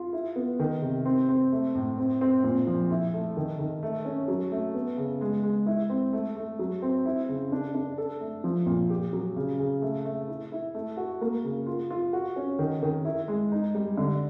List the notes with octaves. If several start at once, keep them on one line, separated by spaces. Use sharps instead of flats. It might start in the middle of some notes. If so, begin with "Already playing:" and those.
Already playing: F4
E4
B3
D#3
C3
C4
C4
A3
A2
C4
C4
A#2
F3
E4
A3
D#3
D#3
A3
C#4
F#3
A3
B3
C#3
G#3
G#3
E4
C4
A3
A3
F#3
C4
E4
C#3
D4
D4
A4
A3
F3
A#2
G4
F#3
C#3
C#3
A3
A3
E4
E4
A3
F#4
A#3
C#3
F4
F4
F#4
C#4
D#3
D#3
E4
G#3
D#4
G3
D3